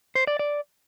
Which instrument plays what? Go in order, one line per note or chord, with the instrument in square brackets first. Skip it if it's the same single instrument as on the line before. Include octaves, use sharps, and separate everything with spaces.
[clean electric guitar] C5
D5
D5